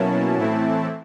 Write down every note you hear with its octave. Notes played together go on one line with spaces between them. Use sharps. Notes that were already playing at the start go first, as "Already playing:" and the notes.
Already playing: B2 F#3 A#3 C#4 E4 A5
A2 E3 A3 C4 E4